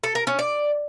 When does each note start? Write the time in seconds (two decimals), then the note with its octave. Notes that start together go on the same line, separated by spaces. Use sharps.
0.03 A4
0.15 A#4
0.27 C#4
0.39 D5